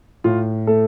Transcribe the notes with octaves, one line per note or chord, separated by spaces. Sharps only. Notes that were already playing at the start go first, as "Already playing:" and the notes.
A2 F4
A3 A4